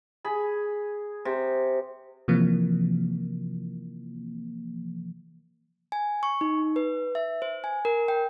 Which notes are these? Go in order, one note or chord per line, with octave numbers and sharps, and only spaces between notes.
G#4 B5
C3
C3 E3 F3 A#3
G#5
C#6
D#4
B4
E5
C5
G#5
A#4
G5